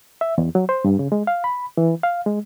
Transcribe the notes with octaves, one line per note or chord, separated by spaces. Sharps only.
E5
E2
F#3
C5
G2
C#3
G#3
F5
B5
E3
F5
G#3